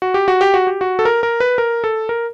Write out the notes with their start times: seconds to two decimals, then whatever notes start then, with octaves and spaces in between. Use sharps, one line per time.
0.02 F#4
0.14 G4
0.28 F#4
0.41 G4
0.54 F#4
0.67 G4
0.81 F#4
0.99 A4
1.05 A#4
1.23 A#4
1.40 B4
1.58 A#4
1.84 A4
2.09 A#4